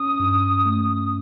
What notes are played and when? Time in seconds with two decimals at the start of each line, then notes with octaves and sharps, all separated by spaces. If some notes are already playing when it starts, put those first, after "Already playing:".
Already playing: C#4 D#6
0.20 G2
0.66 A3